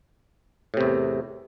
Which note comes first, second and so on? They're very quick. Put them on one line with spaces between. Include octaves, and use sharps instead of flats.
A2 C3 E2